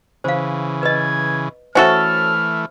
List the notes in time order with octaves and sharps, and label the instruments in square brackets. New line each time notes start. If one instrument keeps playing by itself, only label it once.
[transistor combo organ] C#3 E3 [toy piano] C5 F5
[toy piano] B4 D#5 [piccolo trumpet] G#6
[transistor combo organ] E3 A3 [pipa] C#4 F#4 A4 [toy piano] C5 E5 [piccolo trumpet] F6